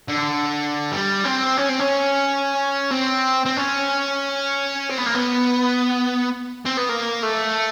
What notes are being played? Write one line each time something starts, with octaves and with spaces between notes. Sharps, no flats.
D3
G3
C4
C#4
C4
C#4
C4
C4
C#4
C4
B3
A#3
B3
C4
B3
A#3
A3